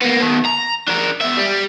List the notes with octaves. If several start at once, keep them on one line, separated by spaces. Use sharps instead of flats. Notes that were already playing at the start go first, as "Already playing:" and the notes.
A#3 B3
B2 D#3
A#5
D4 A#4
B2 E5
G3